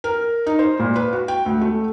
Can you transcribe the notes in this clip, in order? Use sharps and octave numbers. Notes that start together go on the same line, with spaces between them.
A#4
D#4
C5
A#2
B4
F#4
G5
D2
A3